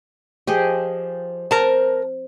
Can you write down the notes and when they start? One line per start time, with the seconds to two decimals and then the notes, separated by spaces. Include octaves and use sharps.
0.47 F3 G4 G#4 D#5
1.51 C4 A#4 A5